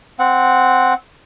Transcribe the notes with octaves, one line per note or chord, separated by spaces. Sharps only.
C4 F#5